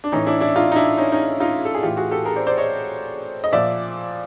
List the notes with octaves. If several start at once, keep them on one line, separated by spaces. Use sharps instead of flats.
D4
A2 E3 C#4 D#4
D4 E4
D4 E4
D#4 F4
D#4
D4 E4
C#4 D#4
C#4 D#4
D#4 F4
A4
G#4
A2 E3 F4 G4
F#4 G#4
G4 A4
G#4 A#4
C5 D5
C5 D5
C#5 D#5
D#5
A#2 F3 D5 E5